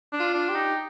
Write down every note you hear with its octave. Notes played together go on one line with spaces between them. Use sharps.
D4
F4
D4
G4
D#4